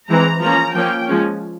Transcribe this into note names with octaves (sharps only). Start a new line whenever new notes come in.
E3 G#3 C4 A#5
F3 A#3 C#4 A#5
F3 A#3 C#4 G5
F3 G#3 C#4